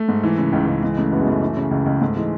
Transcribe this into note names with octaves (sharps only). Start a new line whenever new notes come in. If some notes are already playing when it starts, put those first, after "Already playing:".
Already playing: A3
G#2
E3
C#3
C#2
C#2
E3 G#3
C#3 A3
F#2 B3
G#3
F#2 A3
E3
C#3
C#2
C#2
G#2 A3
E3 G#3